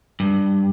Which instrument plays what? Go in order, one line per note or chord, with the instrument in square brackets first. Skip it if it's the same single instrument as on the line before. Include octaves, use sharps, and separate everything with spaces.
[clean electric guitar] G2